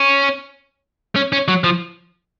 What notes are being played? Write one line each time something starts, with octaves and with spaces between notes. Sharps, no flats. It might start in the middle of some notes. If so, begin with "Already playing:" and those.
Already playing: C#4
C#4
C#4
F#3
F3